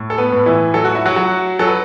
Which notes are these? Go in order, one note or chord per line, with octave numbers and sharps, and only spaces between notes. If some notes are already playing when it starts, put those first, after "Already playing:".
Already playing: A2
A4
B3 B4
A2
E3 E4
F#3 A4
F#4
E4
F#3 F#4
F#3
F#3 A4
B4